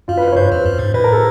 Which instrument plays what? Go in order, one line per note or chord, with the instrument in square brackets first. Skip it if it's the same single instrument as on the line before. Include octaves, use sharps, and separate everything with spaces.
[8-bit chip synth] F#2 [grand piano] F4
[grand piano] B4
B4 C#5
[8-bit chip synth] G2 [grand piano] C5
[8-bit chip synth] F2
F#2
G#2
[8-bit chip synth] A2 [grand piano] B4
[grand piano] A#4
A4